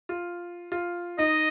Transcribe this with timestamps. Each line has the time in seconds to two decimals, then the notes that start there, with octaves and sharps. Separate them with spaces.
0.09 F4
0.72 F4
1.18 D#4 D#5